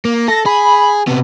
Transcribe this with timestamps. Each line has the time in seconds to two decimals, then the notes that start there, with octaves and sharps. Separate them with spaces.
0.05 A#3
0.28 A4 A#6
0.46 G#4 B5
1.07 C3 B3